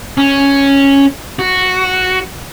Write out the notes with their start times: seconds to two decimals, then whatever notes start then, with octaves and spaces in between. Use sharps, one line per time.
0.18 C#4
1.39 F#4